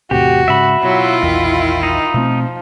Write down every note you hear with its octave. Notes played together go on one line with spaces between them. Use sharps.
E2 A2 C3 F#4 G4
G#2 C#3 E5 B5
B2 F#3 E4 F4
A#1 E2 D#3
D#4
B2 F3 A3 C4